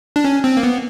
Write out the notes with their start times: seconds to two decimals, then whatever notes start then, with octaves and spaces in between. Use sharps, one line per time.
0.16 D4
0.24 C#4
0.44 C4
0.57 A#3
0.63 B3